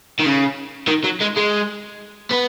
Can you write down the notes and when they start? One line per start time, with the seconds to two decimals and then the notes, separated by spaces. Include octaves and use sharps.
0.19 D#3
0.25 C#3
0.88 D#3
1.04 F#3
1.21 G#3
1.36 G#3
2.31 B3